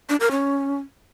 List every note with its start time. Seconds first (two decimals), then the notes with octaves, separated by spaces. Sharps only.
0.09 D4
0.20 A#4
0.31 C#4